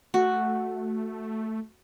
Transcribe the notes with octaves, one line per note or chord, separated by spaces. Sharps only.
A3 F#4